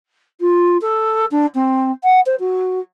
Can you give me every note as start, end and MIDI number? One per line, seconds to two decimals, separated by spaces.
0.40 0.77 65
0.81 1.25 69
1.31 1.46 62
1.55 1.91 60
2.04 2.20 78
2.26 2.35 72
2.39 2.80 66